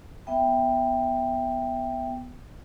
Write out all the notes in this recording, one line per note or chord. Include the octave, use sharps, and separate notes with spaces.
B3 E5 G5